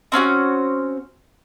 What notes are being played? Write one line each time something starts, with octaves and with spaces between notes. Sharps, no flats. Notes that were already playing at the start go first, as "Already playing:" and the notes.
C4 C#4 F4 F#4